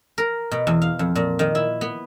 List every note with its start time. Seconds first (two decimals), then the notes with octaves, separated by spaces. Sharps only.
0.18 A#4
0.51 B2
0.67 E2
0.82 F5
0.99 F2
1.15 A#2
1.39 D#3
1.55 E4
1.81 B3